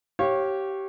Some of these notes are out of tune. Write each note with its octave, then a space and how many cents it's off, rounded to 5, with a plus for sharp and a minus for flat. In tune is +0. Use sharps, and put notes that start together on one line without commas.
G4 -20 C#5 -25 F5 +0